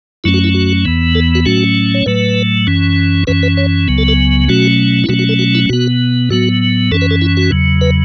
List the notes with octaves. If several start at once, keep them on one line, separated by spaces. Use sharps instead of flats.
F#2 F#3 A3 C#4 E4
F#4
E4
F#4
E2 E3 B3
A4
F#4
A2 F#3 A3 C#4 F#4
C#5
A2 F#3 A3 B4
F#2 E3 C#4
F#2 E3 C#4 B4
B4
C#5
C#2 C#3 F#3 B3
A4
A4
B2 F#3 A3 C#4 F#4
E4
B2 F#3 A3 C#4 F#4
F#4
A4
F#4
E4
B2 B3 F#4
A2 F#3 B3 F#4
F#2 E3 C#4 A4
B4
A4
E4
F#4
E2 C#3 F#3
B4